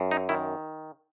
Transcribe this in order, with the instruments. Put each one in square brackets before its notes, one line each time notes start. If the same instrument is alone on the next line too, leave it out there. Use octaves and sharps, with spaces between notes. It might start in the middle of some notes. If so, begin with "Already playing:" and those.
Already playing: [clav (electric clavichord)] F#2
D#4
D#3 E4